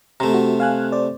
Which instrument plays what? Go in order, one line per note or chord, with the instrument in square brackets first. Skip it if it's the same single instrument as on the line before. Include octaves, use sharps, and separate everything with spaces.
[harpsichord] C3 A3 [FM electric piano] A#5
[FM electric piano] F#4
F5 G#5 F#6
C5 D5